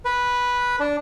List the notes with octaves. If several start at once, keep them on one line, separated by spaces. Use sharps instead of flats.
B4
D4